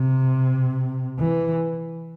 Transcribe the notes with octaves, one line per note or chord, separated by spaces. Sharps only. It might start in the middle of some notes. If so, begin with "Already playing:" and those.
Already playing: C3
E3